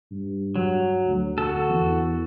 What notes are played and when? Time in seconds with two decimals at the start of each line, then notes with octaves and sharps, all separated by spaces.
0.11 G2
0.56 F#3
1.05 D2
1.38 F#4 A4
1.69 E2